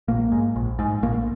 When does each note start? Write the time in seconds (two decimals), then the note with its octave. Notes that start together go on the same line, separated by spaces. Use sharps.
0.08 A#1 A#3
0.32 G#2
0.56 A#1
0.79 G#2
1.03 A#1 A#3